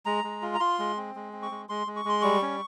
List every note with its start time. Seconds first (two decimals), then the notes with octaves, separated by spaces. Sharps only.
0.06 G#3 A#5
0.24 G#3
0.42 F4
0.54 A#5
0.60 F4 C6
0.79 G#3
0.97 C4
1.15 G#3
1.33 C4
1.43 C#6
1.51 G#3
1.69 G#3 C6
1.87 G#3
1.96 C#6
2.05 G#3 C6
2.22 G3 C#6
2.42 C#4